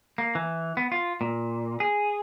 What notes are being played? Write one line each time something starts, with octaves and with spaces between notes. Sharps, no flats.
A#3
E3
B3
F4
A#2
G#4